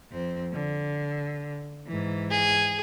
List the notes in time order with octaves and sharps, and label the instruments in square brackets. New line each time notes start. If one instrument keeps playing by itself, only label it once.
[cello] F2 C4
D3
G#2 E3
[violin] G#4